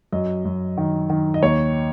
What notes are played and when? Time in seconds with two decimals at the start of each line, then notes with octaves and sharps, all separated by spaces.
0.13 F#2 D#5
0.45 F#2
0.78 D#3
1.10 D#3
1.34 D#5
1.42 D#2 C#5